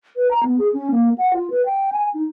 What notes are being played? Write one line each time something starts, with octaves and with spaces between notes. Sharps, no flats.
B4
A#5
B3
G#4
C#4
A#3
F#5
F4
B4
G5
G#5
D#4